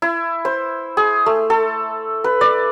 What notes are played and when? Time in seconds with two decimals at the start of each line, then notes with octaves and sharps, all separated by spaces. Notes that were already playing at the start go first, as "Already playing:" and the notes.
0.02 E4
0.45 C5
0.97 G#4
1.26 A3
1.50 A4
2.24 B4
2.41 D5